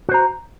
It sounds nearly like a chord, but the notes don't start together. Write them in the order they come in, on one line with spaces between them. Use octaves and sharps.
F#4 C5 A#5